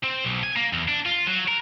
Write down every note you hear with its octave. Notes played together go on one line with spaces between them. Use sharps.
C4
B1
G#5
A#3
E2
D4
F4
F#3
A#4